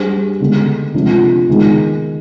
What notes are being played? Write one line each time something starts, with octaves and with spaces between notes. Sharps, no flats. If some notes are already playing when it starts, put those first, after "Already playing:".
Already playing: G3 D4 G#4 C5
D3 G#3 B3
C3 F3 G#3 D4
D#3 G#3 B3